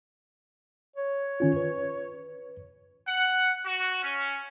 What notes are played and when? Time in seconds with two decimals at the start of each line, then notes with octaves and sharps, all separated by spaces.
0.96 C#5
1.40 D#3 C#4 F4
1.56 B4
3.08 F#5
3.65 F#4
4.03 C#4